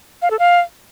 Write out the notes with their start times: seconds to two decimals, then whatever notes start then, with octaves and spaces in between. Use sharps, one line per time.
0.22 F5
0.31 A4
0.39 F5